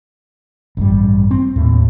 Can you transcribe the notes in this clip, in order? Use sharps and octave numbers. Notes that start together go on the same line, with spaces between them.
A1 G2 G3
C4
D#2 A2